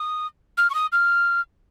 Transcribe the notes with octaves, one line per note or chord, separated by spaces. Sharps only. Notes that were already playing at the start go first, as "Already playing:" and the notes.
Already playing: D#6
F6
C#6
D#6
F6